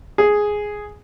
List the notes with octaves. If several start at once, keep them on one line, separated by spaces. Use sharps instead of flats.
G#4